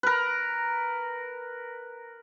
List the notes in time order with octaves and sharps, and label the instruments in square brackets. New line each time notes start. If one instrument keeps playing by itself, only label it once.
[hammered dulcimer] A#4 B4